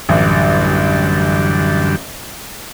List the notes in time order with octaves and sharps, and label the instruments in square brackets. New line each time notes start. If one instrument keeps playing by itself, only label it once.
[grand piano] A1 [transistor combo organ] F#2 D3 G3